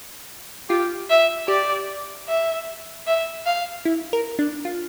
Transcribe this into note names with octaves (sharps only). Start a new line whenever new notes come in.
F4 G4
E5
G4 D5
E5
E5
F5
E4
A#4
D4
F4